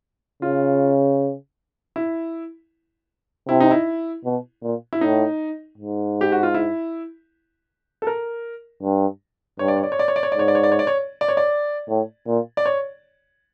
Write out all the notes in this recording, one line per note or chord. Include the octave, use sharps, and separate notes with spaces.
C#3 F4
E4
C3 E4
D#4
E4
B2
A#2
E4
A2 D#4
G#2
G4
F#4
F4
E4
A4
A#4
G2
G2 C#5
D5
C#5
D5
C#5
D5
C#5
D5
C#5
D5
G#2 C#5
D5
C#5
D5
C#5
D5
C#5
D5
C#5
D5
A2
A#2
D5
C#5